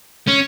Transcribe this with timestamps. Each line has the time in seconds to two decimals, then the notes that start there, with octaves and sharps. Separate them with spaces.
0.28 C#4